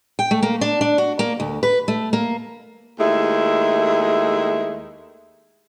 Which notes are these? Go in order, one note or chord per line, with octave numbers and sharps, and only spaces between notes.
G5
A3
A#3
D4
D4
F#4
A#3
D2
B4
A3
A#3
D#2 G#3 A3 E4